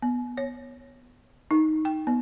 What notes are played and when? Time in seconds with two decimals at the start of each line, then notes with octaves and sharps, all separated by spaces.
0.02 B3
0.37 C#5
1.51 D#4
1.85 G5
2.07 B3